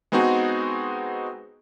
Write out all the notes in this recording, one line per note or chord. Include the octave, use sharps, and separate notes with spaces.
G#3 B3 C4 D#4 F#4 G#4